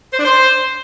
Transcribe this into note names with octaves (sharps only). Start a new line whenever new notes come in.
C5
D4
C5